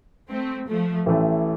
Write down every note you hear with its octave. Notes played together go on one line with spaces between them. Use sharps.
A3 C4
F3 A3
A1 A2 E3 A3